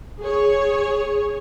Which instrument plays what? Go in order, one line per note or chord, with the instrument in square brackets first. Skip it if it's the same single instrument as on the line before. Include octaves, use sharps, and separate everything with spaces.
[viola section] G#4 C#5